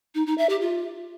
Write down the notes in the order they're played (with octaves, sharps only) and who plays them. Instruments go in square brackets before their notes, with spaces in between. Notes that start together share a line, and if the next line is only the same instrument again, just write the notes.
[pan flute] D#4
D#4
E5
G4
F4